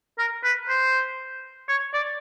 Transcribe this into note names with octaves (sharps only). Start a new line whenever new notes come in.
A#4
B4
C5
C#5
D5